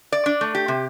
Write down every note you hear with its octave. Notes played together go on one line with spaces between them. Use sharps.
D5
D4
A3
G4
C3